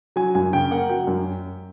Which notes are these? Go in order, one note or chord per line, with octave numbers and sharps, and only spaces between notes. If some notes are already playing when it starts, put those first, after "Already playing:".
F#3 G#5
F#2 G#5
C#3 G5
A#3 F#5
F#3 G5
F#2